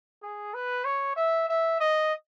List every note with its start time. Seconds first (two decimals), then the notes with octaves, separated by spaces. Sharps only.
0.23 G#4
0.54 B4
0.85 C#5
1.16 E5
1.49 E5
1.80 D#5